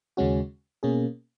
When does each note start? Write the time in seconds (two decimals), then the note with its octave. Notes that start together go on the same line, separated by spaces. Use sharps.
0.17 D#2 C#3 G#3 C#4 F#4
0.83 B2 A#3 C#4 G#4